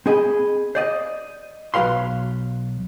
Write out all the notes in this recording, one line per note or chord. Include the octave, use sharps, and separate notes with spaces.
C4 G#4 D#5 B5
C5 D5 D#5
B1 F#3 F#4 B4 F5 C6